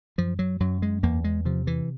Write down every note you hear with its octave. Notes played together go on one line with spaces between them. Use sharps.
F#2 F3
F#3
F#2 F#3
G#3
E2 A#3
G#3
C3 F3
E3